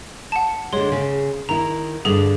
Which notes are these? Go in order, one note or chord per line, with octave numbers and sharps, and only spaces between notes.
F#5 A5
D3 G#3 C#5 C6
C#3
D#3 E4 A#5
G2 D3 G#4 A4 F#7